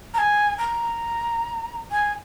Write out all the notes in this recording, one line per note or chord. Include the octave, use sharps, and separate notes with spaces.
A#5
G#5
A#5
G#5